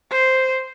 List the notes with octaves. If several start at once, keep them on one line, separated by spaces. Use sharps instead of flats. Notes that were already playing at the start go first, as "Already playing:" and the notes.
C5